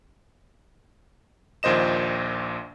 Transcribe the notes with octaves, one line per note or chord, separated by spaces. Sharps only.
A#1 D#2 A#2 C5 D#5 E7